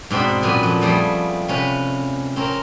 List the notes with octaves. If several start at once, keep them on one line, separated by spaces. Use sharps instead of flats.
G#2 B2 C4 D4 B5
F#2 A#2 B3 G#5
F2
F3 G3 A3 G#4
C3 C#4 B4
C4 C#4 A#4